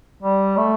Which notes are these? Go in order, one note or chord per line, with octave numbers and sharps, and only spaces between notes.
G3
A3